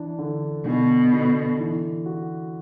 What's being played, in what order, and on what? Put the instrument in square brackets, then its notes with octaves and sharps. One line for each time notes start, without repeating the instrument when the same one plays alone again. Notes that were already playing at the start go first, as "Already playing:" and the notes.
Already playing: [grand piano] E3 D4
D3
[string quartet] B2 [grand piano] D3
[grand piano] D3
E3
F#4